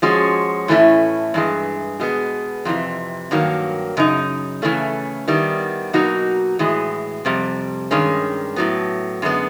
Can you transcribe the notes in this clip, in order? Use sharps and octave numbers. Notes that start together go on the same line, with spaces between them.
F3 G#3 C#4 F#4
A2 E3 A3 C#4 E4
G2 E3 G#3
B2 G#3 B3
F2 C3 E3
G2 D#3 F#3 A#3
F#2 C#3 D#4
C#3 E3 A3 C#4
D#3 G3 B3 E4
B2 F#3 A#3 D#4 F#4
A2 E3 G#3
F2 C3 G3
G2 D#3 G#3 C#4
A2 F#3 B3
F#2 D3 G#3 B3